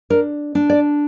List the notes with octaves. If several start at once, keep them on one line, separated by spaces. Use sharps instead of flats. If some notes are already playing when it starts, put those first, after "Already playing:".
D4 A#4
D4
D5